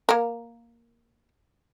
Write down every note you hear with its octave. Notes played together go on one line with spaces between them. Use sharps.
A#3 A#4